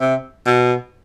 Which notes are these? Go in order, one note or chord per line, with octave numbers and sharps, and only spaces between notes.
C3
B2